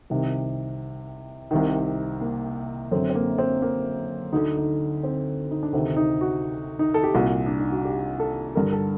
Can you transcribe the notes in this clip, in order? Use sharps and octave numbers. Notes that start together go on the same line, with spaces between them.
C2 C3 D#3
C2 C3 D#3
A#3
F#2 D3 C4
C4
A#3
C4
A#3
D2 D3 D#4
D#4
C4
D#4
D4
D2 C3 D#3 C4
D#4
F#4
D#4
A4
G4
C2 A#2 F#4
D4
D#4
F#4
G4
A4
G2 D3 A#4
A4